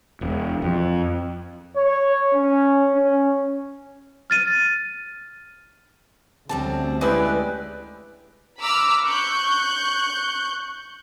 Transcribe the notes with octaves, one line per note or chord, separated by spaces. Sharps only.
E1
F2
C#5
C#4
C#4
F6 A6 D#7
D2 F#3 G3 A3 C4 C#4 A5
G#3 E4 G4 B4 D5
A#5 B5 D6 E6 F6
C#6 F#6 G6